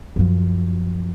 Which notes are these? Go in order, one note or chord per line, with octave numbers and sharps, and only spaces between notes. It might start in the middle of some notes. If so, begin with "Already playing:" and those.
F#2 F3